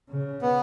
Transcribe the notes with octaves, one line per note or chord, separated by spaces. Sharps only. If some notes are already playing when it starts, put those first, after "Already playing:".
C#3
B3